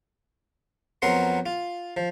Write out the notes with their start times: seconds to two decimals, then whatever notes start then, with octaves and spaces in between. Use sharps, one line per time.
1.02 F2 F#3 B3 A#4 F#5 C6
1.46 F4
1.97 F3